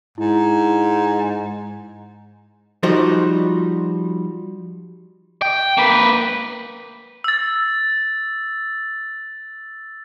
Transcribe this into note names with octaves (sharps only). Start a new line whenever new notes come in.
G#2 E4
F3 G3 D#4 F#4 C5
G5
A#3 B4
E6 A6